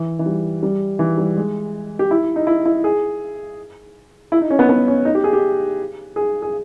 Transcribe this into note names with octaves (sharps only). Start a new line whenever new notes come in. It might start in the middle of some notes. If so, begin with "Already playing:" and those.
Already playing: E3
E3
G3
G3
E3
G3
G#3
G4
E4
D#4
E4
E4
G#4
E4
D#4
C#4
B3
B3
C#4
D#4
G4
G#4
G4
G#4
G#4